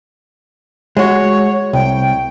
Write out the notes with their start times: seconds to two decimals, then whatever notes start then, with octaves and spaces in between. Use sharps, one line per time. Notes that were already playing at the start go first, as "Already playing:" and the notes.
0.97 G#3 F#4 C#5
1.73 C2 G5